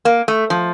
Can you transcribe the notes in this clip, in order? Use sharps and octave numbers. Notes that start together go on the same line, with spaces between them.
A#3
A3
F3